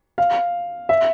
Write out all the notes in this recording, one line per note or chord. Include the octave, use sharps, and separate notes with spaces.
F5
E5